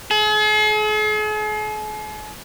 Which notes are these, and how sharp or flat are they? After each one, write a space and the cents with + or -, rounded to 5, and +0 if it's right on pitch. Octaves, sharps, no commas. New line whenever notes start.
G#4 +45